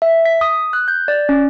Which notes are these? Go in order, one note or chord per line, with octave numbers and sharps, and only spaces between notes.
E5
B6
D#6
F#6
G6
D5
C#4